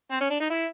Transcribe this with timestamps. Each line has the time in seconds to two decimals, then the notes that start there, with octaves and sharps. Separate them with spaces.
0.11 C4
0.21 C#4
0.30 D4
0.40 D#4
0.50 E4